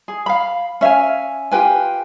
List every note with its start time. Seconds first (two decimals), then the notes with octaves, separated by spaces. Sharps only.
0.08 G#4
0.26 F5 B5
0.81 C#4 E5 F5 G#5
1.51 F4 G4 B4 G#5